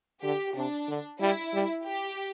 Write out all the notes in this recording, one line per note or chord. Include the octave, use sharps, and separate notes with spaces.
D3 G4
C3 D4
D3
G3 E4
G3
G4